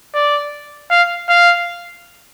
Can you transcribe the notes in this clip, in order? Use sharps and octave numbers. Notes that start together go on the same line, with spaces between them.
D5
F5
F5